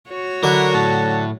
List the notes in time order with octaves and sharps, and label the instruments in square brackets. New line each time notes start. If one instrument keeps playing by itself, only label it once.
[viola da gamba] F#4 C#5
[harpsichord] D3 F#3 [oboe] E4 [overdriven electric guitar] A#4
[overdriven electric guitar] A2 [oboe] A5